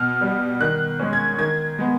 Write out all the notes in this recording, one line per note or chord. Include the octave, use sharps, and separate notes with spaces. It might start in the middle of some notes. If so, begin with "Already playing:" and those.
Already playing: B2 F6
G3 B3
D#3 F#6
G#3 C#4
G#6
D#3 G#6
G#3 B3